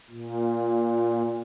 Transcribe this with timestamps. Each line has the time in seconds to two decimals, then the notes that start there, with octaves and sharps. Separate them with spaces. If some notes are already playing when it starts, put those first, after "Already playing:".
0.10 A#2